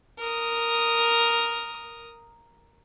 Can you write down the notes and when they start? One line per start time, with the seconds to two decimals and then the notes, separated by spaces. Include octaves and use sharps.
0.19 A#4 D#6